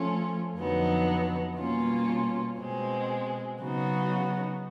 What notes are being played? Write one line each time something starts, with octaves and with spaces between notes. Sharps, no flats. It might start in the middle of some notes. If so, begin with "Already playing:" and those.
Already playing: F3 A3 C#4 F4
F2 D3 F#3 B3 D#4
B2 G3 A#3 C#4 F4
B2 G#3 C4
C#3 F#3 B3 D#4 F#4